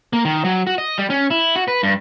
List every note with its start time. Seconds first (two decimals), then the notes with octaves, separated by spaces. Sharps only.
0.13 A#3
0.25 D#3
0.44 F#3
0.67 F#4
0.78 D#5
0.98 G3
1.10 C#4
1.30 E4
1.56 F#4
1.68 B4
1.83 G2